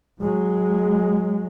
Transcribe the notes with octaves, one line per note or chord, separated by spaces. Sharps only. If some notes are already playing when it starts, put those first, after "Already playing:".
F#3 G#3